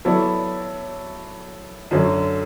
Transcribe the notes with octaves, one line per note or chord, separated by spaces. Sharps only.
F#3 B3 E4 A4 D5
F#2 D3 F#3